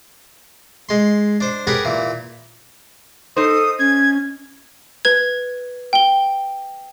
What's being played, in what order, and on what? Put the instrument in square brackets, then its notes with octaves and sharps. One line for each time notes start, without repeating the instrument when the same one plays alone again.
[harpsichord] G#3 C6
D4 C5
G4 G#4 A#4 B4 D5 F#5
A#2 E3
[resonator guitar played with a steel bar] D#4 C5 [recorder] A4 [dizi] D#6
[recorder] C#4 [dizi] G#6
[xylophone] B4 G#6
G5 G7